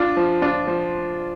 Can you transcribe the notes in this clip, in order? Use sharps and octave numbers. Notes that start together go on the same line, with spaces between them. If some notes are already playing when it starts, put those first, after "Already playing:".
Already playing: D4 F4
F3
D4 F4
F3